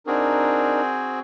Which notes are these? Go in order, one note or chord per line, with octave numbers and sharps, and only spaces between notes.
C4 D4 D#4 F#4 G#4 A#4